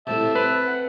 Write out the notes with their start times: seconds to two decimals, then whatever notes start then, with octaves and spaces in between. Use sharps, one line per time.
0.07 A2 C3 E5 A5
0.35 C4 B4
0.67 F#5